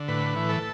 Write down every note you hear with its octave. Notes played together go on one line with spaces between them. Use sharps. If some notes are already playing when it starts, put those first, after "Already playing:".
Already playing: D3
A2 B4
E3
A4